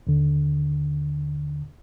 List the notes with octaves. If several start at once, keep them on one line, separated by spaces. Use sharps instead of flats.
D#2 D3